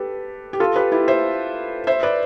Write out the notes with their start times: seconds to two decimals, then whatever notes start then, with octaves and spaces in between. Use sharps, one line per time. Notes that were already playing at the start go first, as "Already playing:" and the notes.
Already playing: G4 A4 B4
0.53 G4
0.60 F4 A4
0.76 G4 B4
0.92 E4 G4
1.08 C5 E5
1.87 C5 E5
2.03 B4 D5